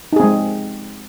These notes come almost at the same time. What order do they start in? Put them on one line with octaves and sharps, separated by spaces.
D#4 G#4 C4 G#3